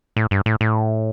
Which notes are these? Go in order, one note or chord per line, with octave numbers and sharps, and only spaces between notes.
A2
G2
A2
A2